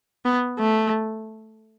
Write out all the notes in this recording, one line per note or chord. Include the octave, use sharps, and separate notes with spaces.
B3
A3